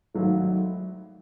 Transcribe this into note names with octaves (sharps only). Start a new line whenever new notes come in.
G#1 G#2 F#3 A3